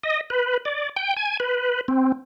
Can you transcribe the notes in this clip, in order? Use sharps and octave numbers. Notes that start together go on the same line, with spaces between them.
D#5
B4
D5
G5
G#5
B4
C4